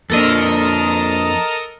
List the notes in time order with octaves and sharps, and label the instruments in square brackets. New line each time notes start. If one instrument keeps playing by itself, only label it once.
[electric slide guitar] F2 A#3 D4 [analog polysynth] A4 A#4 D#5